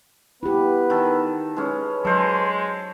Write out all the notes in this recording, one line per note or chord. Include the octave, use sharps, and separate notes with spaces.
B3 E4 G4 B4
D#3 A4
G#3 C#4 B4
F#3 G#3 A4 C5 C#5